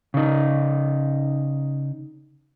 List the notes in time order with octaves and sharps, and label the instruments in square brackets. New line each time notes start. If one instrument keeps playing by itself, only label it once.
[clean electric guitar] C#3 D#4